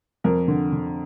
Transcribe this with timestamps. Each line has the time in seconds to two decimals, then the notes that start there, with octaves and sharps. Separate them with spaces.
0.24 F2 A#4
0.48 D3
0.72 D3